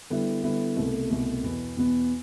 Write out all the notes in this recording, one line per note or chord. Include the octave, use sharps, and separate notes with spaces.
D3 G3 B3 E4
D3 G3 B3 E4
C2 B2 A3
C2 B2 A3
E2 B2 B3
E2 B2 B3